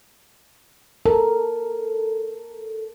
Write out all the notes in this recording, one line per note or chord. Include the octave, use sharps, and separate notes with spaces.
A4 A#4